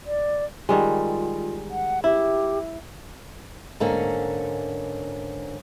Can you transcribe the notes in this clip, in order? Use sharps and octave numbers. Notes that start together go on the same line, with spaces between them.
D5
D#3 G3 G#3 F4
F#5
E4 G4
G#2 D3 A#3 C#4